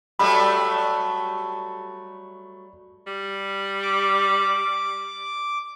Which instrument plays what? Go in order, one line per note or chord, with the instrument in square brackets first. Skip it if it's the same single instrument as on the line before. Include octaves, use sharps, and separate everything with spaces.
[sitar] F#3 G3 A3 [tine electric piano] B5
[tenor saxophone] G3
[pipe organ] D6